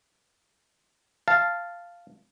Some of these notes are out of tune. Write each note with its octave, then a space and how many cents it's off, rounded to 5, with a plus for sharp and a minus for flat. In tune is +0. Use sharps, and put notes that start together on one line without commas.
F5 -5 A5 +0